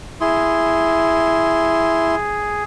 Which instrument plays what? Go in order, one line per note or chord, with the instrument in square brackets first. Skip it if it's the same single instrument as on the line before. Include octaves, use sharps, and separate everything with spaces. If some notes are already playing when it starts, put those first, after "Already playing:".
[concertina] E4 C6 [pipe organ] G#4